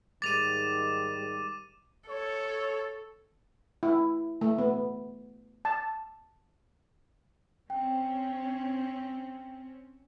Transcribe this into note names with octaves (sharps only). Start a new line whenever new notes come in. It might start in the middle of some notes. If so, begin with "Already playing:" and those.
G#2 D#3 G3 D6 A6 D#7 F7
A4 C#5
E4
A3
B3
A5
C4 C#4 G5